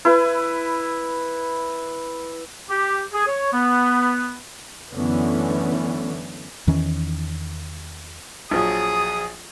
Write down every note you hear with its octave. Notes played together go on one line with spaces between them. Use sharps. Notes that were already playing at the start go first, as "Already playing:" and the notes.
E4 B4
G4
G#4
C#5
B3
F#2 D3 E3 A3 B3 C#4
E2 D#3 E3 C#4
A#1 F3 F#3 G#4 D#6